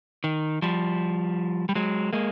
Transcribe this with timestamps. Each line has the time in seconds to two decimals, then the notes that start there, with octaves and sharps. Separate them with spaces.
0.24 D#3
0.62 F3 G3
1.69 G3
1.75 F#3 G#3
2.13 G#3 A#3